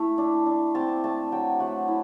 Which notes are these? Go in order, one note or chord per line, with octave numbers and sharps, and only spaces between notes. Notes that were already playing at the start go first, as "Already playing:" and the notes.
Already playing: A3 E4
D4
D4
C4 A5
A3 A5
F#3 G5
A3 F#5
E4